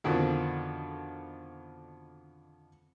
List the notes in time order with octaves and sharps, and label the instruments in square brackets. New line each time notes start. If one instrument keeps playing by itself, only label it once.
[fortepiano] F2 B2 D3 D#3